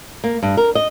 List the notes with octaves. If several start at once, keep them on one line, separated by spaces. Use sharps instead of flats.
A#3
G2
A#4
D#5